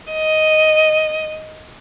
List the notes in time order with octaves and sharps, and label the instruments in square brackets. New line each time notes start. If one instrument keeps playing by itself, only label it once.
[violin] D#5